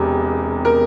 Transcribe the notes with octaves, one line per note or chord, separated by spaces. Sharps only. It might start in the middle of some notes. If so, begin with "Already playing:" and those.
Already playing: E1 E2 C3
A#4